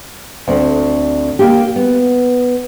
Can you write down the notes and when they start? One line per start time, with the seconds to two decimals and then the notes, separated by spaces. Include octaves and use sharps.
0.48 D2 C4
1.39 A#3 G4
1.76 B3